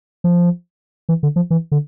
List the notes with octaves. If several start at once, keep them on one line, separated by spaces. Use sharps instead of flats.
F3
E3
D3
F3
E3
D3